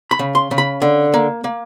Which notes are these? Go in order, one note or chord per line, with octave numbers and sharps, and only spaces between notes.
B5
C#3
C6
C#3
B5
D3
A#3
A#3